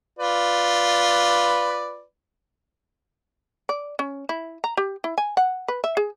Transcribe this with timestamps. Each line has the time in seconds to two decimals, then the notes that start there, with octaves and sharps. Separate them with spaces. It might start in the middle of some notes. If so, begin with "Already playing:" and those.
0.19 F4 B4 D5
3.69 D5
3.99 C#4
4.29 E4
4.64 A#5
4.77 G4
5.04 E4
5.18 G#5
5.37 F#5
5.68 B4
5.84 E5
5.97 G#4